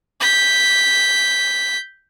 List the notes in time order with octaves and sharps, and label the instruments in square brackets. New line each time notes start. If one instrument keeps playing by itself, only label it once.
[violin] G6 B6